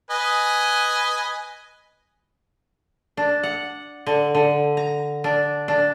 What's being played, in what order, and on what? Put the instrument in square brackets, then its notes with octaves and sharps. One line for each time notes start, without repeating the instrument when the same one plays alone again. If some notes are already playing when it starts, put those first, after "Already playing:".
[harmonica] B4 D#5 G#5
[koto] D4
F#5
D3
D3
A#5
D4
D4